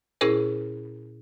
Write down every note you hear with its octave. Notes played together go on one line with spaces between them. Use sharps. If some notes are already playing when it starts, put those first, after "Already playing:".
A#2 C#4 E4 G#4 A#4 C5